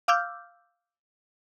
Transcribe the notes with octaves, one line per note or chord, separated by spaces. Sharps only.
F5 D6 E6 F6 G6